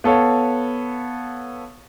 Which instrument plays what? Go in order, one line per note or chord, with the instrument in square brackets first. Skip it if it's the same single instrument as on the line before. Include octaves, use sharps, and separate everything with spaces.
[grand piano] B3 A4 C#5 F5